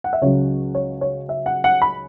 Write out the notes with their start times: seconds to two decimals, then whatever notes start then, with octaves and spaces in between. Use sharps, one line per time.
0.04 F#5
0.13 E5
0.22 C#2 C#3 F#3 C#5
0.75 C#5
1.01 C#5
1.29 E5
1.46 F#5
1.64 F#5
1.82 B5